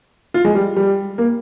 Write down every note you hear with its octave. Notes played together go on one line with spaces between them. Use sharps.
F4
G#3
G3
G3
A#3